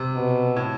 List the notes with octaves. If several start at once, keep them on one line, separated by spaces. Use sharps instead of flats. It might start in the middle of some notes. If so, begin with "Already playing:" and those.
Already playing: C3
B2
A2